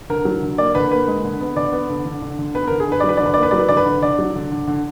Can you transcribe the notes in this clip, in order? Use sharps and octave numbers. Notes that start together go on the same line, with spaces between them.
D3 A#4
F#3
D3
A#3 D5
D3 B4
A#3 B4
G#3
D3
B3
D3 D5
B3
D3
D3
D3
D3
B3 B4
A#4
D3
G#4
D3 B4
D5
F#3
B4
D3 D5
B4
A#3 D5
B4
F#3 D5
B4
D3 D5
B4
D3
D3 D5
F#3
D3
D3
D3